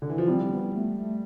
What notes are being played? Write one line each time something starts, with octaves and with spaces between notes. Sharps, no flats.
D3
E3
F3
G3 C4
C4
B3
A3
A3